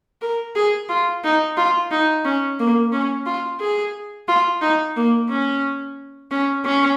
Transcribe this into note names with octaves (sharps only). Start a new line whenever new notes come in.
A#4
G#4
F4
D#4
F4
D#4
C#4
A#3
C#4
F4
G#4
F4
D#4
A#3
C#4
C#4
C#4